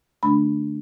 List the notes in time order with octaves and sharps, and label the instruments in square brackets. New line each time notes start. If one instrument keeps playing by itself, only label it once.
[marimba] D3 A3 D4 B5